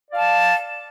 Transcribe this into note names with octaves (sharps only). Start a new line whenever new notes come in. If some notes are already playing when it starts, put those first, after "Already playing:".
D5 F5 A5